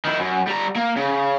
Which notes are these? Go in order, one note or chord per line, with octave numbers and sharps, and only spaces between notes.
D#3 E4
F#2
G3 A#5
A#3
C#3